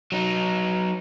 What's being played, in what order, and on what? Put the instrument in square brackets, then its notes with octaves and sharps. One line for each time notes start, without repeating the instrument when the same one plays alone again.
[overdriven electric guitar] F#3 D#4